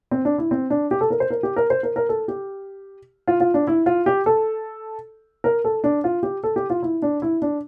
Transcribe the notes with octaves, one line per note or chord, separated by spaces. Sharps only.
C4
D4
E4
C4
D4
G4
A4
A#4
C5
A#4
G4
A#4
C5
A#4
A#4
A4
G4
F4
F4
D4
E4
F4
G4
A4
A#4
A4
D4
F4
G4
A4
G4
F4
E4
D4
E4
D4